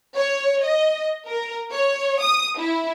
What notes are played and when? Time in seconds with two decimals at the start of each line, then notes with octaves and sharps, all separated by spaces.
0.16 C#5
0.63 D#5
1.28 A#4
1.73 C#5
2.21 D#6
2.58 E4